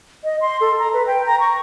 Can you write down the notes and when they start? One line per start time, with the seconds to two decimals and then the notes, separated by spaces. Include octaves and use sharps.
0.24 D#5
0.41 C6
0.61 A4
0.79 A#5
0.93 B4
1.07 G5
1.26 A#5
1.40 C#6